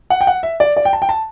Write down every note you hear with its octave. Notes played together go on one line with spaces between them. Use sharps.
F#5
G5
F#5
E5
D5
D5
G5
A5
G5
A5